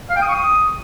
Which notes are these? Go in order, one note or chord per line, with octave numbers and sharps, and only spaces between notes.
F5
G5
D#6
C#6
D#6